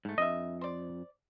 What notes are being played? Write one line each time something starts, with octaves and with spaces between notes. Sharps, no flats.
G#2 A3
F2 D4 D#5 E5
C5 D5